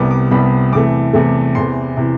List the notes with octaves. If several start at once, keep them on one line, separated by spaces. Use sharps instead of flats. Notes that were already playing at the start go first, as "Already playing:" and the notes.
Already playing: C2 C3 G3 B3 D6
D6
C2 C3 G3 B3 B5
E2 C3 E3 A3 D6
E2 C3 E3 A3
E2 C3 E3 C6
C3 E3